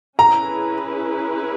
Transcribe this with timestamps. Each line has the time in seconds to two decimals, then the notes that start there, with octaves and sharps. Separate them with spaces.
0.19 C#4 E4 G#4 B4 A#5